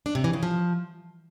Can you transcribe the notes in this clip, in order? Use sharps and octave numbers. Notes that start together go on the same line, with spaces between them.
D4
C3
E3
C#3
F3